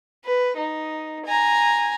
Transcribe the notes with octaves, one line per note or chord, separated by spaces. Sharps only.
B4
D#4
G#5 A#5